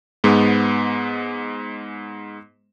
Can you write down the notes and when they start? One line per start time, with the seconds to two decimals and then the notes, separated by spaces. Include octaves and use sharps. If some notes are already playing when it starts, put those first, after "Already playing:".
0.24 G#2 G#3 B3